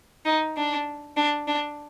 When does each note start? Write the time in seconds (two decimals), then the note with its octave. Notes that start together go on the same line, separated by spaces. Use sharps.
0.25 D#4
0.56 D4
1.17 D4
1.47 D4